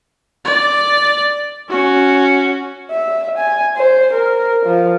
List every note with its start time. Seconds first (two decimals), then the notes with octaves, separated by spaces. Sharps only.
0.45 D5
1.70 C#4 F#4
2.91 E5
3.38 G#5
3.77 C5
4.13 A#4
4.66 F3